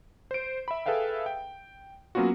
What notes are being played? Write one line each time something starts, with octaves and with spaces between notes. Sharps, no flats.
C5 D7
E5 B5
G#4 A4 B4 E5 F5 G5
G5
F#3 A#3 B3 C#4 F4 F#4